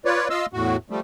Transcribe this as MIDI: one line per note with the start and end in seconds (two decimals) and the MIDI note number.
0.05 0.28 65
0.05 0.28 71
0.05 0.28 73
0.05 0.28 74
0.30 0.46 65
0.30 0.46 75
0.30 0.46 77
0.30 0.46 84
0.30 0.46 88
0.53 0.77 40
0.53 0.77 45
0.53 0.77 66
0.90 1.00 53
0.90 1.00 55
0.90 1.00 57